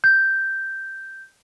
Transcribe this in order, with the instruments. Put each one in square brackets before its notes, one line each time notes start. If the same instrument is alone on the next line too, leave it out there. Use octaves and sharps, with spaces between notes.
[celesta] G6